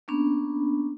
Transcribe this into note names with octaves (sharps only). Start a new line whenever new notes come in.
A#3 B3 C#4 D4 B5